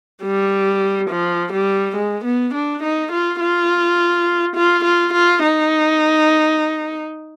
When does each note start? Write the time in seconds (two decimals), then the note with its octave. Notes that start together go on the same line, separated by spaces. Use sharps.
0.22 G3
1.09 F3
1.52 G3
1.95 G#3
2.24 B3
2.53 D4
2.81 D#4
3.11 F4
3.39 F4
4.55 F4
4.83 F4
5.12 F4
5.41 D#4